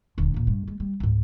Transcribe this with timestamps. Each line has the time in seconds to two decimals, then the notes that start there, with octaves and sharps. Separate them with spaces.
0.18 D#1 D3
0.34 D#2 A#2
0.47 G2
0.68 G#3
0.80 G3
1.00 C#2 G#2